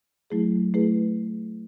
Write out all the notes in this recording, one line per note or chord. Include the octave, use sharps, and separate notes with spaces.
F#3 A3 E4 G#4
A3 E4 G#4 B4